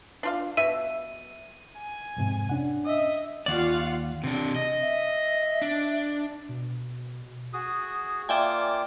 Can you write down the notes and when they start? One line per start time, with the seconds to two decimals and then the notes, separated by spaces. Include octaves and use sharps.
0.23 D4 F4 F5
0.57 B2 E5 D#7
1.77 G#5
2.17 F2 G#2 C3
2.49 C#4 D4 F#5
2.85 D#5 E5
3.46 D#2 F4 D5 F5 F#5
4.24 C3 D4
4.56 D#5
4.82 E5
5.62 D4
6.49 B2
7.53 F#4 G#4 D#6
8.29 A#3 F4 D5 E5 G5 G#5 D6